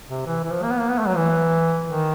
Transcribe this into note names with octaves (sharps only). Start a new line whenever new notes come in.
C3
E3
E3
F3
A#3
B3
A#3
B3
A3
F#3
E3
D#3